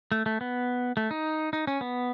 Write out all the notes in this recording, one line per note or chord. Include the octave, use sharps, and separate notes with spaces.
A3
A3
B3
A3
D#4
D#4
C#4
B3